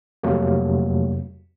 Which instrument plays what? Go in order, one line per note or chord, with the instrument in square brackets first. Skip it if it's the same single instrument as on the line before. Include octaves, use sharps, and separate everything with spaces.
[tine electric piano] F2 C3 F#3 A3 A#3